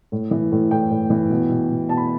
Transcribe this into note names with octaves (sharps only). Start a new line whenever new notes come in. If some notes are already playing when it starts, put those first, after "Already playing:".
A2
E3
A2
A2 G5
A2
E3
B2
B2
B2
B2 A5
B5